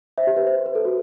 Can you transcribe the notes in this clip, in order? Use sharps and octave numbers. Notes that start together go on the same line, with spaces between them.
C5 E5
G4
B4
C5
B4
A4
F#4